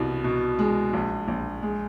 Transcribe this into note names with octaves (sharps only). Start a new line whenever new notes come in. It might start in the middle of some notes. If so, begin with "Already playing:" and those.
Already playing: C2 B2
B2
G#3
A#1
A#1
G#3